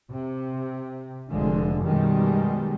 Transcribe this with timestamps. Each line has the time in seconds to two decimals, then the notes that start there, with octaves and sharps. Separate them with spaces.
0.12 C3
1.31 F1 D3 F3 G#3
1.84 F#2 B2 D#3 G3 G#3